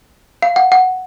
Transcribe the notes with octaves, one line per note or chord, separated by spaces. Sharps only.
F5
F#5
F#5